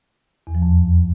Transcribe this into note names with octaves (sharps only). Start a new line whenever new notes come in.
E2
F3
F2